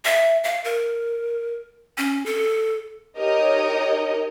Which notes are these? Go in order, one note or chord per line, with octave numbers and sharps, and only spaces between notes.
E5
F5
A#4
C#4
A4
D#4 G4 A#4 C#5 D#5